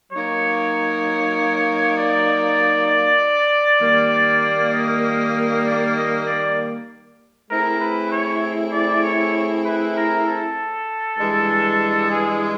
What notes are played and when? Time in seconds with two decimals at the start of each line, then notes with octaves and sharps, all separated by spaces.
0.12 F#3 A#3 D#4 C#5
1.97 D5
3.80 D#3 G3 A#3
4.73 D#5
5.65 D5
5.96 D#5
6.27 D5
7.50 A3 C4 E4 G#4 A#4
7.81 B4
8.12 C#5
8.73 D5
9.03 C#5
9.65 B4
9.96 A#4
10.26 A4
11.18 G2 E3 G#3
12.11 G#4